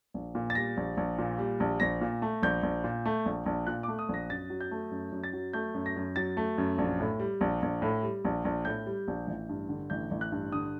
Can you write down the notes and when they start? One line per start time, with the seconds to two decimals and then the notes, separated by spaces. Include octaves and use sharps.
0.14 A#1
0.35 A#2
0.50 A6
0.55 G3 A#6
0.77 A#1
0.97 A#1
1.19 A#2
1.39 G3
1.60 A#1
1.80 A#1 A#6
2.01 A#2
2.22 A3
2.43 A#1 G6
2.63 A#1
2.84 A#2
3.06 A3
3.26 A#1
3.46 A#1
3.67 A#2 F#6
3.83 D6
3.88 A3
3.99 D#6
4.09 A#1 A#6
4.30 F#2 A6
4.50 F#3
4.61 G6
4.71 A3
4.91 F#2
5.12 F#2
5.24 A6
5.33 F#3
5.53 A3 G6
5.74 F#2
5.86 A#6
5.96 F#2
6.16 F#3 A6
6.37 A3
6.58 F#2
6.78 A#1
7.00 A2
7.20 G3
7.41 A#1
7.62 A#1
7.82 A2
8.03 G3
8.25 A#1
8.45 A#1
8.65 A2 G6
8.86 G3
9.08 A#1
9.27 A1
9.49 G2
9.69 D3
9.90 A1 G6
10.11 A1
10.21 F#6
10.32 G2
10.52 D3 D#6